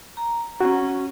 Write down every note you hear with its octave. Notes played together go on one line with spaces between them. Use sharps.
A#5
C#4 F#4